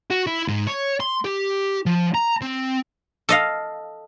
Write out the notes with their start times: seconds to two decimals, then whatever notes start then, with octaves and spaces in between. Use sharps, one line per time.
0.11 F#4
0.27 E4
0.48 G#2
0.67 C#5
1.00 C6
1.25 G4
1.86 F3
2.14 A#5
2.41 C4
3.29 A4 D#5 F5